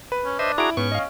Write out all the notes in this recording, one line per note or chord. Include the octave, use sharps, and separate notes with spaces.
B4
C#4
D4 C5 D#5 E5
E4 F#4 G#4 A#5 D7
G#2 B3 C#4 C#6
D#5 F5